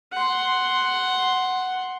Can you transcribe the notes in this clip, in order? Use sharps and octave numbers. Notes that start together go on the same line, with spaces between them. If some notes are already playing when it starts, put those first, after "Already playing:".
F#5 C6